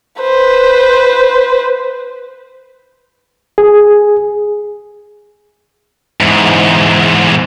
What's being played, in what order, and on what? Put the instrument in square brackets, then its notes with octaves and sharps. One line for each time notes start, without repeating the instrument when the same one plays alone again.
[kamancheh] B4 C5
[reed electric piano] G#4
[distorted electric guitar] E2 G#2